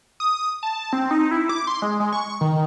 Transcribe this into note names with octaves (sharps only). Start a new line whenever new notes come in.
D#6
A5
C4
D#4
E4
D6
C6
G#3
G#3
C#6
D#3